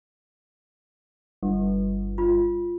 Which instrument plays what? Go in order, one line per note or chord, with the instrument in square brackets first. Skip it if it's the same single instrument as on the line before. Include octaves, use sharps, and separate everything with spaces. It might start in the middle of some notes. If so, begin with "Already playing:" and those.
[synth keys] G1
[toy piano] F4